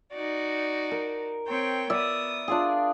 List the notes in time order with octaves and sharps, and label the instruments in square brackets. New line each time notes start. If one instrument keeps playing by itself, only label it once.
[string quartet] D#4 F#4 D5
[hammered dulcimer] A#4
[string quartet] C4 C#5 G5
[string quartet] B3 D#6 [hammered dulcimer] D5 E5
[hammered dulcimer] D4 F4 G#4